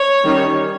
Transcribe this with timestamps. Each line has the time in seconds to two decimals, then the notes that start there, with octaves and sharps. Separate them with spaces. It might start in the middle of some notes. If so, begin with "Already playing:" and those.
Already playing: C#5
0.24 D#3 G3 C#4